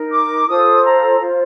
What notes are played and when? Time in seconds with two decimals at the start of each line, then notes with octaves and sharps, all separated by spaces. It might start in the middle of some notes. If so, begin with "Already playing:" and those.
Already playing: D#4 A#4
0.11 D6
0.47 F4 A4 C5 D#6
0.84 A#5
1.19 F4 C5